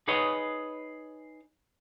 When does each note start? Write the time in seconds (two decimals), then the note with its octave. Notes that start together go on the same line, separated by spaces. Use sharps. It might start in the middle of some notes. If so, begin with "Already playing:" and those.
0.08 D#4 G#4 B4 C#5 D#5